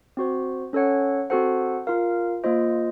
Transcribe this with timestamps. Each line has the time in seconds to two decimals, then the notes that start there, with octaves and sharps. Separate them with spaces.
0.17 C4 F#4 C5
0.73 C#4 A4 C#5 F#5
1.30 C4 F#4 A4 C5 F#5
1.87 F4 A#4 F5
2.44 A#3 F4 C5 D#5